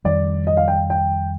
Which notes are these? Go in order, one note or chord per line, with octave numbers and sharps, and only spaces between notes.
F2 D#3 G3 D5
D#5
F5
G5
G5